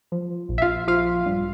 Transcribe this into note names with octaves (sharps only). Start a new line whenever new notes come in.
F3
A#1
E5
F4 F5
F3 F4 F5
G2